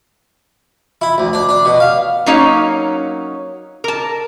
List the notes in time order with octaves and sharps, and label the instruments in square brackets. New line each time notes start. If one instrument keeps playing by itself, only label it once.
[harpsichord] E4
D2
D4
D4
B2
F5
[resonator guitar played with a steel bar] F#3 A#3 C#4 D#4 C#5 F5
A#4 A5